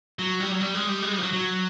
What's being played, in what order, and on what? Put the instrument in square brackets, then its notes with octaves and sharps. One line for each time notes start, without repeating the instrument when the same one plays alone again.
[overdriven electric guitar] F#3
G3
F#3
G3
G#3
G3
G#3
G3
F3
F#3
F#3